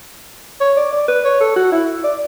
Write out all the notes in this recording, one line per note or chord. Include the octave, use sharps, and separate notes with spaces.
C#5
D5
D5
B4
C#5
A4
F#4
E4
D5